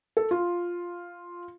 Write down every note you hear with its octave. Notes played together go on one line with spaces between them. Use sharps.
A4
F4